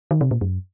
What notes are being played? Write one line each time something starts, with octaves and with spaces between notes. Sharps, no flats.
D#3
C3
A#2
F#2